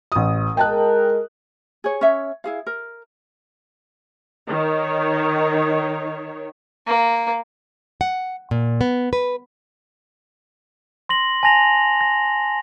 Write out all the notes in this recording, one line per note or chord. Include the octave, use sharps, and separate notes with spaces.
A1 D#6
G#3 A#4 D#5 G5 A5 F#6
G#4 C#5
C#4 C#5 E5
E4 G#4 F5
A#4
D#3 C#5
A#3
F#5
A#2
B3
B4
C6 A#6 F#7
G#5 A5 A#6 F7
A#6